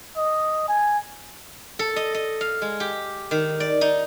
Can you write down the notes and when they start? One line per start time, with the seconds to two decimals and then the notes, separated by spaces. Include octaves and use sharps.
0.17 D#5
0.68 G#5
1.79 A4
1.96 D#5
2.14 D#5
2.41 F5
2.62 G#3
2.80 G4
3.31 D#3
3.60 D5
3.81 D#4